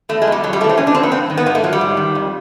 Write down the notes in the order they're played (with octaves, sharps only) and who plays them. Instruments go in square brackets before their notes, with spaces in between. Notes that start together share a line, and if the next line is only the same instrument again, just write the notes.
[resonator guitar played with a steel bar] E2 A3
G#3
B2 G3
F2 F#3
G3
C3 A3
E3
C4
A#2 C#4
D4
F3 C4
B3
G2 C4
D#3
B3
G#2 A#3
A3
F3 F#3
G3
G#2
D#3
F2